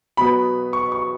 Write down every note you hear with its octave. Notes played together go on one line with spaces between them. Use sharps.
B2 F#3 B3 B5
C#6
C#6